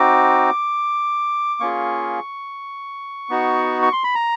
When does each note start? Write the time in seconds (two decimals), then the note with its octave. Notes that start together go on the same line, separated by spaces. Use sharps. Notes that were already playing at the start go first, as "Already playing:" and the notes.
Already playing: C4 D#4 F#4 D6
1.60 A#3 C#4 F4 G#4 C#6
3.30 B3 D#4 F#4
3.82 C#6
3.93 C6
4.04 B5
4.15 A#5